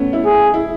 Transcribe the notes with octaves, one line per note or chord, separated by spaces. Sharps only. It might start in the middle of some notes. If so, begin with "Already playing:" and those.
Already playing: A3 B3 C#4
E4
G#4
E4